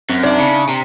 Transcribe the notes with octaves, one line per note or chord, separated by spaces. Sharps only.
F#2 C4
D4 D#4 E5
C#3 C#7
C3 A#5